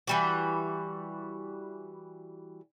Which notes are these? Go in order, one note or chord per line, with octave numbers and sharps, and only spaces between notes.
E3 G3 F#4